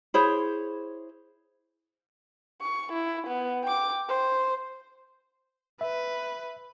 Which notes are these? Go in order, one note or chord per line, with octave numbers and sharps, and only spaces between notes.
E4 G#4 C5 C#5
C#6
E4
B3
G5 D6
C5
B4 E5